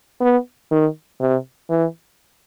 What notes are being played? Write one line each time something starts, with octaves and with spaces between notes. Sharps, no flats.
B3
D#3
C3
E3